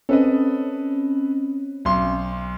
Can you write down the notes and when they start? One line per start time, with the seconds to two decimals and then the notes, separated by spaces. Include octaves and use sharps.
0.09 C4 C#4 A4 B4 D#5
1.85 B1 C6